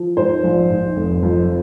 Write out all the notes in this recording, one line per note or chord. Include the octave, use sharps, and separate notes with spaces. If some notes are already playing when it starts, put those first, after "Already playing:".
Already playing: F3
G#2 C5
A#1
G#2
F1
F2